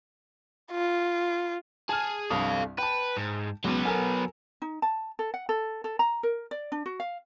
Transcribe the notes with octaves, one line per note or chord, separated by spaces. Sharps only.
F4
G#4 A5 F6
C2 G2 A4 F5 D#6
B4 G5 A5
G#2
C#2 B2 F#3 B3
A4 A#4 G#5
D#4
A5
A4
F#5
A4
A4
A#5
A#4
D5
D4
F#4
F5